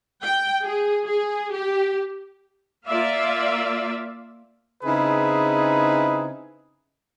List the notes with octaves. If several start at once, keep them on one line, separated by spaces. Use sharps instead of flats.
G5
G#4
G#4
G4
A#3 F4 D5 E5 F5
C#3 C4 D#4 E4 G#4 B4